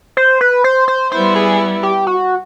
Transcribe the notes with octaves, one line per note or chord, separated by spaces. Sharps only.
C5
B4
C5
C5
G3 B3 E4 C5
G#4
G4
F#4